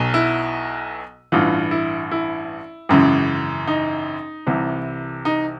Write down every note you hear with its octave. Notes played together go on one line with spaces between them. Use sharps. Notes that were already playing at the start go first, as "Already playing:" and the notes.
Already playing: B1 B2 F#3
E4
A1 G2 E3 F4
E4
E4
G#1 F#2 C#3 E3
D#4
C2 C3 E3
D#4